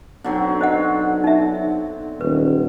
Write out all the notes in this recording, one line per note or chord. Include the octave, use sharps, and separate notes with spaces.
B1 D3 F#3 C4
C5 D#5 F#5
D#4 E5
D#1 B4